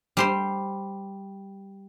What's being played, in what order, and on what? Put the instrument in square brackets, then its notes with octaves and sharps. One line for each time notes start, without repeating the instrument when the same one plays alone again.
[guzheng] G3 C5 C6